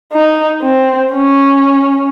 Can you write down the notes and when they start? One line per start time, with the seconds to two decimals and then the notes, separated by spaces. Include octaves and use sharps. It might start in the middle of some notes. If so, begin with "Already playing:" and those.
0.13 D#4
0.62 C4
1.12 C#4